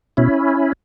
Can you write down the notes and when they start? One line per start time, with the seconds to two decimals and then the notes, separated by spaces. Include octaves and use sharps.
0.17 B2 C#4 E4